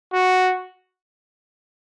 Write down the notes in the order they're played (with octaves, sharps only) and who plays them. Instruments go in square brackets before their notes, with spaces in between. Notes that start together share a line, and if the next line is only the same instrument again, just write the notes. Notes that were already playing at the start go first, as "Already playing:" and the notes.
[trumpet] F#4